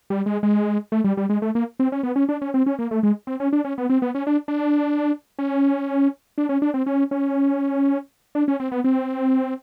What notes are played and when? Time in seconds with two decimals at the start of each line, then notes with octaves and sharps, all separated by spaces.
0.10 G3
0.26 G#3
0.43 G#3
0.92 A3
1.04 G3
1.17 G3
1.29 G#3
1.42 A3
1.55 A#3
1.80 C4
1.92 C#4
2.03 B3
2.16 C#4
2.29 D4
2.42 C#4
2.54 C4
2.66 C#4
2.79 A#3
2.91 A3
3.03 G#3
3.27 C4
3.40 C#4
3.53 D4
3.65 C#4
3.78 B3
3.90 C4
4.02 B3
4.15 C#4
4.27 D4
4.48 D4
5.39 C#4
6.38 D4
6.49 C#4
6.62 D4
6.74 C4
6.86 C#4
7.11 C#4
8.35 D4
8.48 C#4
8.60 C4
8.72 B3
8.84 C4